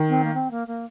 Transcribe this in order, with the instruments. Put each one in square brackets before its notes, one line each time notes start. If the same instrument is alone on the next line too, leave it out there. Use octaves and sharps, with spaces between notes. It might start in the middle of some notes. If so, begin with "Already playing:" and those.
Already playing: [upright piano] D#3
[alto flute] C4
A#3
C4
A#3
A#3